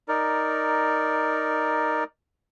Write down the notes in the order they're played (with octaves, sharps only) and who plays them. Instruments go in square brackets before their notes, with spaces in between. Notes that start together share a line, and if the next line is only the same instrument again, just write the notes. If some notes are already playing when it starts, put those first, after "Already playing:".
[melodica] D#4 A#4 D5